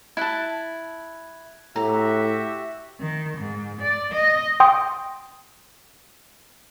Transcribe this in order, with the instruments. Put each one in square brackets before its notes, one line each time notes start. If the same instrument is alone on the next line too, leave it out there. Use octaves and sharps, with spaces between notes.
[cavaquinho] E4 A5 [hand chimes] F#6 G#6
[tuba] A2 [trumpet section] F#4 G4 E5 [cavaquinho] A#5
[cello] D#3
G#2
D5
D#5
[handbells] G5 C6 D#6